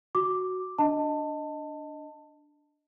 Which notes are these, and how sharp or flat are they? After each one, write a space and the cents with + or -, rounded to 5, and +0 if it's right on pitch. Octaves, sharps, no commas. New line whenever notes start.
F#4 +0 D6 +0
D4 +0 D#5 +0 A5 +20